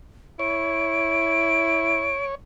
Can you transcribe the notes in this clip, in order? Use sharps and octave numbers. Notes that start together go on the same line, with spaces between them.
E4 C#5 D7